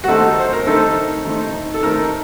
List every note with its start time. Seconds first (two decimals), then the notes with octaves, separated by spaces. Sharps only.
0.04 F#4
0.08 D#3 A3 C4 D#4 A4
0.39 C5
0.53 A#4
0.67 D#3 A3 C4 D#4 A4
1.25 D#3 A3 C4 D#4
1.74 A4
1.83 D#3 A3 C4 D#4 A#4